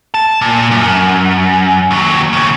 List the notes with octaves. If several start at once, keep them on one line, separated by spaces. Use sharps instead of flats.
A5
A#2
F#2
D#2 F#3
D#2 C#3